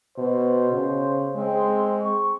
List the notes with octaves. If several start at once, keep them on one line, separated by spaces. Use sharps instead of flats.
B2 C5
C#3
G#3 C4
C#6